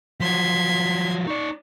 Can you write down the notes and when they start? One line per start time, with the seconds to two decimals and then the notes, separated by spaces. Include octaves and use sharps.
0.20 F3 F#3 C6 G#6 B6
1.27 D#4 D5 C#6